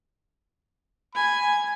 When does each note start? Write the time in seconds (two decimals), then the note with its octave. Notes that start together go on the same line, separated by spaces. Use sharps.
1.15 G#5 B5